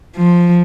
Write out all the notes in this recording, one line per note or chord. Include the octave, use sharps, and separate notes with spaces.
F3